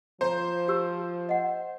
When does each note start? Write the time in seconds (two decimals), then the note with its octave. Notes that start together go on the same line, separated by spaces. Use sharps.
0.21 F3 C5 A#5
0.68 G4 E6
1.29 D#5 F#5